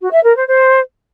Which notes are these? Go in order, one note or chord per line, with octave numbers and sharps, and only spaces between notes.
F#4
E5
A#4
C5
C5